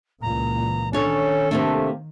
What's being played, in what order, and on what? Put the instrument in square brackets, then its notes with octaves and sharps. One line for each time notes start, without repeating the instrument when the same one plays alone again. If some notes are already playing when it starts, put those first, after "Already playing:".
[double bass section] C#2 A#2 E3 [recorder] A#5
[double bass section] D#3 [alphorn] C#4 [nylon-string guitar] D4 C#5 [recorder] A4
[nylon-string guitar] C3 A#3 D4 [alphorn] A3